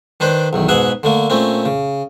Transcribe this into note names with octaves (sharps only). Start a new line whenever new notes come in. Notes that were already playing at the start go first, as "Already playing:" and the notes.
D#3 D4 B4 C5
B1 E2 D#3
G#2 B2 G#4 B4 E5 F#5
D3 A3 A#3
A#2 A3 C4 C#4
C#3